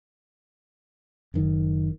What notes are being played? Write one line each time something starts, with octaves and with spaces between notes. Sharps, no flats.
F#1 D#3